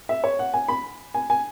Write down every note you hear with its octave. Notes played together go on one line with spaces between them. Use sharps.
E5
C#5
F#5
G#5
B5
G#5
G#5